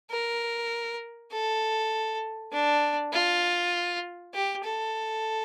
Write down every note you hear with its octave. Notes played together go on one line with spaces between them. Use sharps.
A#4
A4
D4
F4
G4
A4